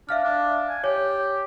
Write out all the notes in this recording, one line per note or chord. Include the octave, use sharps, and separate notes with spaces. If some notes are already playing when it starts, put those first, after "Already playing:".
D4 E5 F5 F6
D4
G#5
G4 C#5